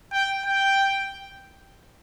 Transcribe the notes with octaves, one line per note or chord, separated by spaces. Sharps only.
G5
G5